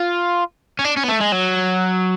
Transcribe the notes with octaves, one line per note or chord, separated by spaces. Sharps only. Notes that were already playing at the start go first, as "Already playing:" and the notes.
Already playing: F4
C#4
D4
C#4
B3
A3
G#3
F#3